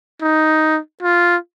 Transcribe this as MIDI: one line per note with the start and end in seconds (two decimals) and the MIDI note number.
0.22 0.79 63
1.03 1.37 65